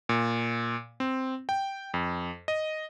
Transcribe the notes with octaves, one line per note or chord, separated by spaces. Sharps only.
A#2
C4
G5
F2
D#5